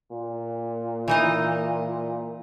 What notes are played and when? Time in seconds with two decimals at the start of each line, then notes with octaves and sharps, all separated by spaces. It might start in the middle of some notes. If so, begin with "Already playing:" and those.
0.11 A#2
1.08 E3 D#4 D#5